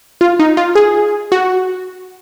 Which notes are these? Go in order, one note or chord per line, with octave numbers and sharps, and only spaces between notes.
F4
D#4
F4
G#4
F#4